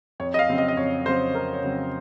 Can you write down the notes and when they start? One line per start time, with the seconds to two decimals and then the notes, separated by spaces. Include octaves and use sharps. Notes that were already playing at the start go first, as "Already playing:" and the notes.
0.20 F2 C#5
0.34 D#5
0.39 F5
0.49 C#3 F#3 C4
0.58 D#5
0.68 D#5
0.77 F2 C#5
1.06 C#3 F#3 C4 C5
1.34 F2 A#4
1.53 C#5
1.63 C#3 F#3 C4